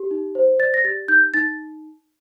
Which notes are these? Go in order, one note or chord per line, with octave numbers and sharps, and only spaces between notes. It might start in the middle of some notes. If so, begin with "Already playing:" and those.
Already playing: G4
D#4
C5
D5 A6
A#6
G4 A6
D#4 G6
D#4 A6